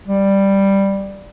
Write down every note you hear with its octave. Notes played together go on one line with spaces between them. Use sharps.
G3